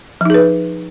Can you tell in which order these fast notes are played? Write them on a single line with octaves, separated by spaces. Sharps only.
F3 D#4 G#4 B4